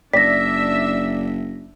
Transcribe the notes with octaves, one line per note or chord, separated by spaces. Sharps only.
F#1 D4 D5 E5 A#6 B6